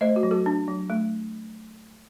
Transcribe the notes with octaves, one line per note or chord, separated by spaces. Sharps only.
A3 C5 D#5
F#4
F#3
F#4 A4
D4
F#3
A3